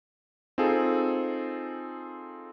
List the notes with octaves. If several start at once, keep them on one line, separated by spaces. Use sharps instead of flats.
C4 D#4 F4 G#4 A4